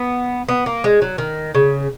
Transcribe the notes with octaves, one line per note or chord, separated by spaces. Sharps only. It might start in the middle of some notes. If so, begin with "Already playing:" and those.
Already playing: B3
B3
A#3
G#3
F#3
D#3
C#3